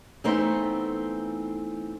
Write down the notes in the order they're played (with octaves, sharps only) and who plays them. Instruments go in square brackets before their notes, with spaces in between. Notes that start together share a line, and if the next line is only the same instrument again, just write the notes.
[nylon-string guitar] E3 A3 B3 C4 D#4 C5